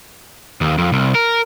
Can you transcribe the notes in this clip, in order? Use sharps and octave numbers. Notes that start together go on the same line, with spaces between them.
D#2
F2
C2
A#4